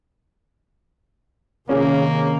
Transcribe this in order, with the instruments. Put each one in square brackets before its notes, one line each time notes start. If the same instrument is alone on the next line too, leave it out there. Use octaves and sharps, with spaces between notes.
[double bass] C3 D#3 [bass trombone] A#3 [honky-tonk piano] C#4 G#4